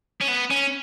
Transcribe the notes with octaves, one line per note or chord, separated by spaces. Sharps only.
C#4
B3
C#4